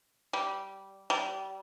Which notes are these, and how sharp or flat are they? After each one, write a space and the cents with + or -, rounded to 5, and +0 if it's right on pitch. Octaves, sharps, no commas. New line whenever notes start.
G3 -15
G3 -30